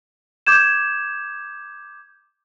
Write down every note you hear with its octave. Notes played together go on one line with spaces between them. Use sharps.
D6 G6 G#6 E7